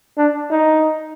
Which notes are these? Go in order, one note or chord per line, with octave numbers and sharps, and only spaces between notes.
D4
D#4